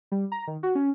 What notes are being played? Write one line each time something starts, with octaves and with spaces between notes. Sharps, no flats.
G3
A#5
D#3
F#4
C#4